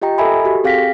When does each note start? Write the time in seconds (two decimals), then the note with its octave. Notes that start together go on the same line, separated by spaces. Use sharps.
0.02 F4 G4 D#5 G5 A#5
0.18 A4 A#4 D#5 E5 G#5 B5
0.45 F#4 G4 A4
0.64 C4 G#4 F5 G5 A#6 B6